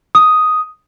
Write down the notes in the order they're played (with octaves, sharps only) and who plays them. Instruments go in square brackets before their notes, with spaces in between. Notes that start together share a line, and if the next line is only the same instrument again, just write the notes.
[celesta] D#6